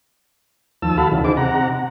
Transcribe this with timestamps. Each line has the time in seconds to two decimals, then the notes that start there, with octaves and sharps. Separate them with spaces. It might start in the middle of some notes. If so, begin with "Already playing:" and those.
0.82 D#2 F3 A5 E6
0.97 F#4 A4 F5 A5 B5
1.11 D2 C#3 E3
1.24 D#4 G#4 C5 D6
1.37 C3 F#5 A#5